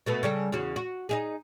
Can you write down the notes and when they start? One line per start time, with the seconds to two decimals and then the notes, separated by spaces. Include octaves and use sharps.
0.06 B2 A3 B3
0.23 C#3 G3 A4
0.52 E2 C#3 F#4
0.76 F#4
1.09 D#4 E4 G#4